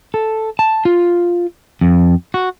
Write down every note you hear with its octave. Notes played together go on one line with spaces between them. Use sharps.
A4
A5
F4
F2
F#4